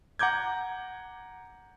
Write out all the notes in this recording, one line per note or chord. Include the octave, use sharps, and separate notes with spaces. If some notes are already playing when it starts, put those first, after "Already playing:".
F#5 A#5 D6 G6 G#6